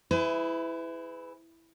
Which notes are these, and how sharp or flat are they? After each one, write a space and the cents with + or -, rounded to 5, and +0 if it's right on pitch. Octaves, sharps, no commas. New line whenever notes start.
E4 -5 G#4 +0 B4 +35